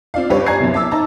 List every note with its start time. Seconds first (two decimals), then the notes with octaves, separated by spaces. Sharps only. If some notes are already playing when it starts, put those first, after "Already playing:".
0.14 C4 F4 D5 F5
0.30 G2 G3 G4 B4 C#5 D5
0.46 D5 G#5 A#5 C#6 G#6 C7
0.60 C2 F#2
0.74 E5 A5 D6 E6
0.91 D#4 A5 A#5